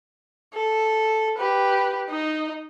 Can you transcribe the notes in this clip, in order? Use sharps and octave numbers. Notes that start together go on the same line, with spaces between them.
A4
G4 B4
D#4 D#5